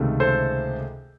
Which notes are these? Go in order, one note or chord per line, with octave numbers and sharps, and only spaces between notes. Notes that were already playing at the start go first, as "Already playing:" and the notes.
Already playing: C#2 C3 D#3 A3
A4 C5